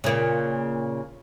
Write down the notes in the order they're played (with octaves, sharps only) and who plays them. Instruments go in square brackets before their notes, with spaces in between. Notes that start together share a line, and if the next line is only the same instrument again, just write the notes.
[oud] A#2 C#3